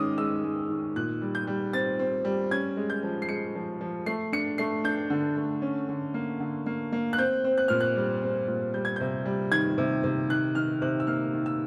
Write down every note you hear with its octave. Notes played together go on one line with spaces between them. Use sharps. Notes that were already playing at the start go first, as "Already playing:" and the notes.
Already playing: D#3 G#3 C#4 D6 D#6
G#3 E6
G#3
D#3
A#2 F#6
G3
G6
G3
C4 A6
C4
G3
C#4 G#6
G#3
G6
F3
C7
G#3 C#7
F3
F3
A3 C7
D4 C#7
A3 C7
D4 G6
D3
A3
C#4
D3
A#3
D3
A#3
A#3
F#6
C4 G6
C4
F#6
A#2 F6
F#6
G3
C4
A#2
G3 G6
G#6
C3 G6
G3
D#3 G#6
C3
C3
D#3 F#6
D#3 F6
C3 F#6
E6
A#3 F6
D#3
E6